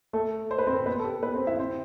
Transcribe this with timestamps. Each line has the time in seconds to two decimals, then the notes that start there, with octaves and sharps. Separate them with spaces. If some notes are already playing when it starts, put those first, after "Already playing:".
0.13 A3 A4
0.51 C5
0.58 B4
0.67 C4 C5
0.86 B3 B4
0.99 A4
1.04 G4
1.23 B3 B4
1.34 C4 C5
1.47 E4 E5
1.59 C4 C5